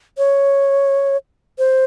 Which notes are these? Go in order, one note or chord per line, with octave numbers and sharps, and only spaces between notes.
C#5
C5